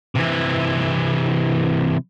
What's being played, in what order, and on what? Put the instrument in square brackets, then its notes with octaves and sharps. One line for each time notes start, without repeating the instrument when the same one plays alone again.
[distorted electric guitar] C3 E3